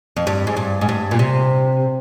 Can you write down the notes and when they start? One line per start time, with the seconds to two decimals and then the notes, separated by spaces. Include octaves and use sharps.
0.17 F2
0.27 G2
0.47 G#2
0.57 G2
0.81 G#2
0.89 G2
1.11 A#2
1.19 C3